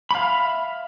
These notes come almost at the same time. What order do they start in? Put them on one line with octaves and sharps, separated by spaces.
B5 F5 E5